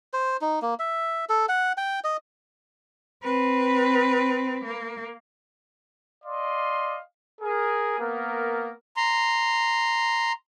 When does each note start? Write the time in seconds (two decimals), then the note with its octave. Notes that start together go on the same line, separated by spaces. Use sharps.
0.13 C5
0.41 D#4
0.62 A#3
0.79 E5
1.29 A4
1.49 F#5
1.77 G5
2.04 D#5
3.23 C4 B4
4.65 A#3
6.24 D5 D#5 F5 C6
7.41 G#4 A#4
7.99 A#3 B3 A#4
8.97 A#5 C6